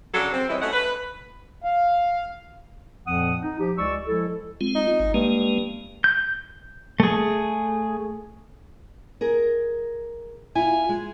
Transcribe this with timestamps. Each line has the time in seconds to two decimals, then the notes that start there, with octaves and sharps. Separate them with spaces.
0.14 C#3 F#3 D4 A4
0.33 C4
0.49 E3 G3 E4 B4 C#5 D#5
0.61 A3 C#4 D#4 F#4 F#5
0.73 B4
1.64 F5
3.07 F2 A#2 F3 C4 F#5 D#6
3.41 D#4
3.60 F3 G4
3.78 C#2 G#3 D5 C#6 E6
4.07 F3 G#3 E4 A4
4.61 G#3 C4 F4
4.75 D#4
5.00 G#1
5.14 G2 G#3 A#3
6.04 G6
7.00 A3 G#4
9.21 G#4 A#4
10.55 E4 F4 G#5
10.89 G#3